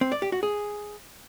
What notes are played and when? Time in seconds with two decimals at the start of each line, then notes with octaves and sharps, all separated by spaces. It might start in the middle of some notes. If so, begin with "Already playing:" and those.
0.01 C4
0.12 D5
0.22 G4
0.32 F#4
0.43 G#4